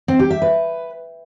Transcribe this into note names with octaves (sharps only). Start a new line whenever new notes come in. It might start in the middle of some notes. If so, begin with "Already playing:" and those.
C4
G4
E5
B4